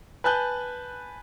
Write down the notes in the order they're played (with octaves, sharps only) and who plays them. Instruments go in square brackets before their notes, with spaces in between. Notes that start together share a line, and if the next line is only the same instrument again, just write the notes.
[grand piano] B4 G#5 A5 F#6 G6